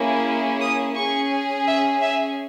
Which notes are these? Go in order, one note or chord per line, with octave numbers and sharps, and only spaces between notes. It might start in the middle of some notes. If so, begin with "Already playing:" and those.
Already playing: A#3 C#4 E4 G#4
D#6
C#4 G#4 C#6
E5
E5